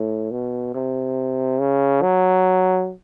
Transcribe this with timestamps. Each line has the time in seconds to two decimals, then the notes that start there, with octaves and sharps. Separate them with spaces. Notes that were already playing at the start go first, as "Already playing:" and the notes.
Already playing: A2
0.31 B2
0.75 C3
1.60 C#3
2.03 F#3